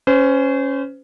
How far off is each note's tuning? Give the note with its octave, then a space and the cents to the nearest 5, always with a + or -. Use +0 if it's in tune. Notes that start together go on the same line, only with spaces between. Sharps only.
C#4 +0 C5 -35